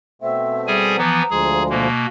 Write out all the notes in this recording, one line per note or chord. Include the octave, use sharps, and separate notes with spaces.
B2 A3 C4 E5
G3 G#4 G#5
E3 F3 B3 A#5
D2 F3 G#3 G#4
B2 A#3